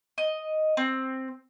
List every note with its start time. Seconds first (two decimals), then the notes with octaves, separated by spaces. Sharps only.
0.18 D#5
0.77 C4